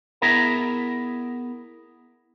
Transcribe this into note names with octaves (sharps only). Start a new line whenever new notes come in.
B3 E4 G#4 A#4 E5 A#5